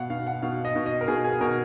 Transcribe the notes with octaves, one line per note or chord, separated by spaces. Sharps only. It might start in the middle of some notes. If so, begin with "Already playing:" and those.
Already playing: B2 F5 F#5
B2 F5
F#5
B2 F5
D#5
B2
D#5
A#4
B2 G#4
G#4
B2 A#4